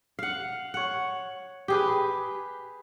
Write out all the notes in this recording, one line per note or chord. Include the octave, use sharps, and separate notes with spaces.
F5 F#5
C#5 F#5
G4 G#4 B4